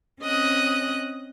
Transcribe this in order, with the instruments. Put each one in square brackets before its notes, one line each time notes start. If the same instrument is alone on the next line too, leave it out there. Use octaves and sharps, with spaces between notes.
[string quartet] C4 C#4 D#5 D#6 F#6